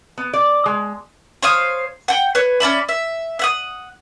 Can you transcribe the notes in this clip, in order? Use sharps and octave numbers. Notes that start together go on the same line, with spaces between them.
B3
D5
G#3
C5 C#5 F5 D#6
F#5 G5
B4 C#5
C#4 D5 E5 B5
E5
E5 F#5 D#6